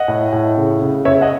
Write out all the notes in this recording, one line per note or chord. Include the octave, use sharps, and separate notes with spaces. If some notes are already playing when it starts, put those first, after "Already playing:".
Already playing: D#5 F#5
A2
A2
C#3
C#3
C#3 C#5 E5
D#5 F#5